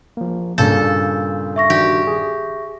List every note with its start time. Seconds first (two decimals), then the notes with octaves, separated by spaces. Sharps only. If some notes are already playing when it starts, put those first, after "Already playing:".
0.17 F3 A#3
0.58 G2 A#2 C#3 A4 G6
1.56 E5 C#6 A#6
1.70 D#3 D4 F#4 G4
2.07 G#4